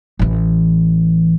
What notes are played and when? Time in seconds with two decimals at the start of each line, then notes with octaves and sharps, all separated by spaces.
0.19 A1 E3